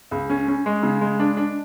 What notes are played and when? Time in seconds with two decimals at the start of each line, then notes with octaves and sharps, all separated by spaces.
0.11 C#2
0.30 C#4
0.48 C#4
0.66 G#3
0.83 C#3
1.01 G#3
1.20 D4
1.37 D4